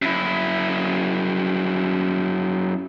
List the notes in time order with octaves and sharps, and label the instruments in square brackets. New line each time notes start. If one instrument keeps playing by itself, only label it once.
[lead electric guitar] F#2 E4